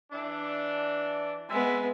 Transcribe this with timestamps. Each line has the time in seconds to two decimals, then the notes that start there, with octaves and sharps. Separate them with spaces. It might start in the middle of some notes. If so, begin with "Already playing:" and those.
0.12 E3 D4
1.50 G#3 B3 E5